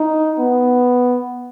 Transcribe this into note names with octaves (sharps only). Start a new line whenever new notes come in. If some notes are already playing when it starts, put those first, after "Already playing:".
Already playing: D#4
B3